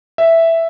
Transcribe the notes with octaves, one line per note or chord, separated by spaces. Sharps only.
E5